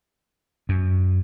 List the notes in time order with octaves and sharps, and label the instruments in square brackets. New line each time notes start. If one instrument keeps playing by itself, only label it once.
[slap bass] F#2